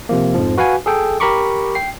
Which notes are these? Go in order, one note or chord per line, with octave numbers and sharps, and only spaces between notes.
C3 F3 A#3
F2 G#2 F3
F#4 B4 F5 F#5 G#5
G#4 A4 G5
G4 A#4 A#5 B5 C#6 D6
G5 C7